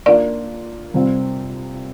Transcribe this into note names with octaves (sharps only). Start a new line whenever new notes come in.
A#3 D4 F4 D5
C3 G3 C4 F4